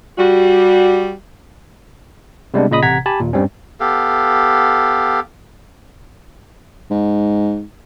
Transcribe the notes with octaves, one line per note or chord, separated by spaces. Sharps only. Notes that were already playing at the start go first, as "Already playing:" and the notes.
G3 F#4
C3 G3 G#3 B3 D4
A#2 C#3 D#5 B5 D#6
A1 C3 F#5 A#5 G#6 B6
G4 G#5 A5 B5
D#2 A#2
G2 G3 C4 C#4
B3 G4 A4 F5
G#2